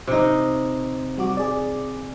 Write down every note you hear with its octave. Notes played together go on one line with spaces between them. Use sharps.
C3 D#4
G3 F#4 D6
G#4 D5